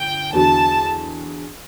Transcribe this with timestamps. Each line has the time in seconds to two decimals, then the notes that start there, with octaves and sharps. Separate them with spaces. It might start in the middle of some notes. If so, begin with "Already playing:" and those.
Already playing: G1 G5
0.33 E2 D3 F#3 B3 F#4 A5